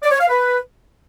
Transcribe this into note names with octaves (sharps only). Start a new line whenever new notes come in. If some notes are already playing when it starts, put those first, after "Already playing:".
D5
C#5
F5
B4